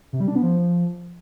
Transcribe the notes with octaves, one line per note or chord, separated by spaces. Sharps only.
C3
G3
D4
B3
F3